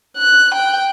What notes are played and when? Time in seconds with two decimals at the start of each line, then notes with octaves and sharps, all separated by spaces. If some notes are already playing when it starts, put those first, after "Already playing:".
0.17 F#6
0.54 G5